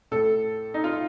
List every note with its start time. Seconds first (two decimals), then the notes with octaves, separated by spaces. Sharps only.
0.11 A2 A4
0.74 D#4
0.84 F4